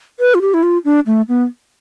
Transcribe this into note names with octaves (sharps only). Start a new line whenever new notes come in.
B4
F4
G4
E4
F4
D4
A3
B3